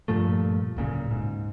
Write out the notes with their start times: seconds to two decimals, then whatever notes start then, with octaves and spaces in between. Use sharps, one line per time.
0.08 G2 A#2 F3 A3
0.76 D1 A#2 C#3
1.11 G#2